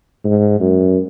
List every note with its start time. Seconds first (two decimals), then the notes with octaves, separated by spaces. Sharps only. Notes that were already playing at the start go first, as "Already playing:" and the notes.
0.25 G#2
0.60 F#2